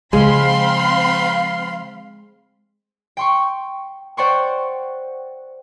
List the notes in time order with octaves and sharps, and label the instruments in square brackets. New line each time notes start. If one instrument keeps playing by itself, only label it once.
[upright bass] C#3 F3 [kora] G#3 [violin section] C4 B5 C6 [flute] F5
[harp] G5 C6 C#6
C5 D5 F#5 G5 C6 C#6